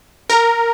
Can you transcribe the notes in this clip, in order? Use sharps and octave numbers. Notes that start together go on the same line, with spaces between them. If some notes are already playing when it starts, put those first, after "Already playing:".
A#4